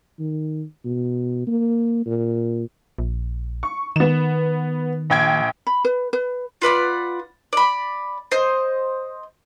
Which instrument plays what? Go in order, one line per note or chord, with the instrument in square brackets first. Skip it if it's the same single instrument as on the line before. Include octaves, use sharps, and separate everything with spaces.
[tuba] D#3
B2
A#3
A#2
[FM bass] A#1
[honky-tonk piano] C#6
[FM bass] D#3 [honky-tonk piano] B3 E7
[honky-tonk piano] A#1 G5 G#6
[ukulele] B5
B4
B4
[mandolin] F4 B4 D5 F#5
D5 B5
C5 D#5